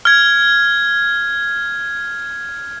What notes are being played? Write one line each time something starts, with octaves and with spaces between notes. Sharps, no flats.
F6 G#6